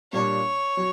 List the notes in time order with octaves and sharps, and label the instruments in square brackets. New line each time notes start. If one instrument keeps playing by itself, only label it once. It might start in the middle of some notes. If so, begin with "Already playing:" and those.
[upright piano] A#2 G3 A#3 D4 [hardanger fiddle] C#5
[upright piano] F#3